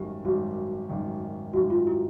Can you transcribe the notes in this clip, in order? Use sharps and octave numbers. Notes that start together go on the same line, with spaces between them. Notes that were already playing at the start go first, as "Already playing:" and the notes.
Already playing: G#1 F#2 D#3 G3 G4
G#1 F#2 D#3 G3 F#4
G#1 F#2 D#3 G3
G#1 F#2 D#3 G3 F#4
F4
E4